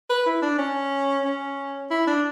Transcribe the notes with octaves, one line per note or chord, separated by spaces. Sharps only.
B4
E4
D4
C#4
C#4
E4
D4